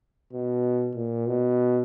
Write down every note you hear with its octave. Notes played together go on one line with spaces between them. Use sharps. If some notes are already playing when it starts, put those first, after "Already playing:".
B2
A#2
B2